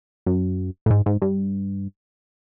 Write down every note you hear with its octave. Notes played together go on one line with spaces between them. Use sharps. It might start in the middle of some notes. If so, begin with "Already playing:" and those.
F#2
A2
G#2
G#2
G2